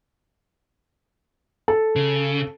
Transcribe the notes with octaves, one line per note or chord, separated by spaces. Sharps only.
A4
C#3